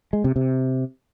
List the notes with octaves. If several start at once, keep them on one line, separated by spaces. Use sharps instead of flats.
G#3
C3
C3